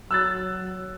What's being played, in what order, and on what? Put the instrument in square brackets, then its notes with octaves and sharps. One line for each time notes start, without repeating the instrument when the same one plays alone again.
[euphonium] F#3 [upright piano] E6 F#6 A6